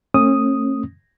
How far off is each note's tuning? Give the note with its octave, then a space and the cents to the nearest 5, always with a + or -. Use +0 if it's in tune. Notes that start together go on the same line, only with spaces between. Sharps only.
A3 +35 C#4 -35 D#6 +0